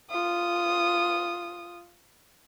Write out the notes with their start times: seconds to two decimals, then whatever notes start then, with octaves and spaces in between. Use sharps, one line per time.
0.11 F4 D#6